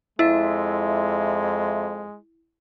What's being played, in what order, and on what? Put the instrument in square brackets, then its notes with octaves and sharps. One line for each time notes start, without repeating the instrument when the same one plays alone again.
[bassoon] F2 [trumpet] G#3 [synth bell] E4 [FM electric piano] E5